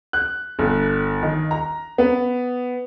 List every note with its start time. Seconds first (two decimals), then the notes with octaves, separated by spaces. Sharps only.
0.13 F#6
0.59 G1
1.23 D#3
1.51 A#5
1.98 B3